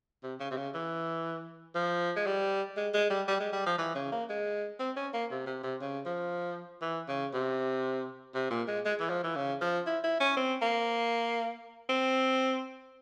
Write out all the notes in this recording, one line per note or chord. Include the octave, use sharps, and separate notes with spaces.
C3
C#3
C3
C#3
E3
F3
G#3
G3
G#3
G#3
G3
G3
G#3
G3
F3
E3
C#3
A#3
G#3
C4
C#4
A#3
C3
C3
C3
C#3
F3
E3
C#3
C3
C3
A#2
G#3
G#3
E3
F3
E3
C#3
F3
E4
E4
C#4
C4
A#3
C4